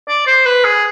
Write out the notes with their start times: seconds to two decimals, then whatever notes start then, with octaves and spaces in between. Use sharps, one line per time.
0.08 D5
0.27 C5
0.46 B4
0.65 G#4